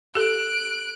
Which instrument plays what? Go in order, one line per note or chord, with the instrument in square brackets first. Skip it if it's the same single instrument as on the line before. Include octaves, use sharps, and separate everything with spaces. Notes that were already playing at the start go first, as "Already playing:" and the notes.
[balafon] G4 A4 [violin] F#6 D7